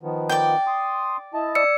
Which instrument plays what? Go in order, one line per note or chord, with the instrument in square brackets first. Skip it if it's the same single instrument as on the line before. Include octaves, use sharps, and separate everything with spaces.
[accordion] D#3 F3 B3
[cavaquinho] D5 G5
[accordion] C6 D#6
E4 D#5 A5
[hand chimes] D5 E6 C#7